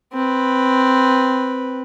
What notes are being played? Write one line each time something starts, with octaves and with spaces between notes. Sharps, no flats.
C4 B4